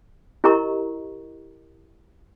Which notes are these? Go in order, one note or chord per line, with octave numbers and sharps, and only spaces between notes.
E4 G4 A#4 D#5 A#5 C#6